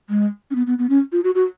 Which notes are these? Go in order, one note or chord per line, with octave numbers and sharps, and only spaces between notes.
G#3
C#4
B3
B3
B3
C#4
F4
F#4
F#4